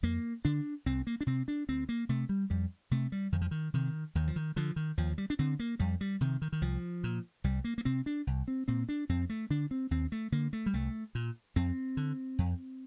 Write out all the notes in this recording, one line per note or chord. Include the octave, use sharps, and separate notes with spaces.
F2 A#3
D3 D4
C2 C4
A#3
D4
C3 C4
D4
D2 C4
A#3
C3 A3
G3
F2 G3
C3 A3
G3
F2 D#3
F3
D#3
C3 D#3
D#2 D#3
F3
D#3
D3 F3
D#3
D#2 F3
G3
D4
D3 C4
A#3
F2 G3
G3
C3 D#3
D#3
D#3
C2 F3
A#2
C2 G3
A#3
A#3
C3 C4
D4
C2
C4
A#2 C4
D4
F2 C4
A3
D3 D4
C4
D#2 C4
A3
D3 A#3
A3
G3
C2 A3
A#2
F2 C4
D3
F2